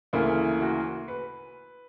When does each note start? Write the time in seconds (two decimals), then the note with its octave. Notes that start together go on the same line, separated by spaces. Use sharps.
0.13 D2 C#3 E3 A#3 E4
0.61 F#4
1.08 B4